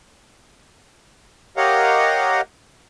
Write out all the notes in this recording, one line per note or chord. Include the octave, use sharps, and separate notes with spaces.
G4 A#4 C#5 D#5 F5 F#5